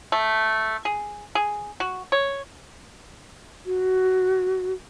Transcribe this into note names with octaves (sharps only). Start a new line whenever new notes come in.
A3
G#4
G#4
F#4
C#5
F#4